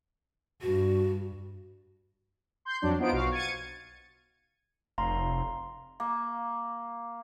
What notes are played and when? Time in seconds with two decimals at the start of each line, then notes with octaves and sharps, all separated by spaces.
0.62 G2 F#4
2.65 C6 G6
2.82 F2 F#3 D4
2.99 B3 D#4 F4 C5 D7
3.12 B1 F#4 F5
3.32 G#6 A6 C#7 D#7
4.98 F1 F5 A#5 C6
6.00 A#3